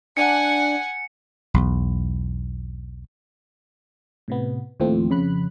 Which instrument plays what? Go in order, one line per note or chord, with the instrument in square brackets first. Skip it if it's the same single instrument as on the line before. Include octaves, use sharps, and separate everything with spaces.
[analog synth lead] D4 [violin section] F#5 G#5 [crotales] C#7
[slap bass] B1 E2
[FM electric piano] A2 C3 B3
D#2 A2 F3 A3 C4
F2 C#3 B5 F#6